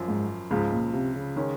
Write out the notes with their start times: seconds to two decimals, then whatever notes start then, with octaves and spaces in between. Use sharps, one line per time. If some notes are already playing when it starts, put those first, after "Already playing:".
Already playing: G#1 F#2 F3
0.08 G#2
0.51 C#2 G#2 C#3 F3
0.72 A#2
0.93 C3
1.15 C#3
1.36 D#3 G#3 C#4